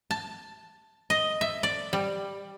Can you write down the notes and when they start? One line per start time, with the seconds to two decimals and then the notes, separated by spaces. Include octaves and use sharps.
0.11 A5
1.10 D#5
1.41 E5
1.63 D5
1.93 G3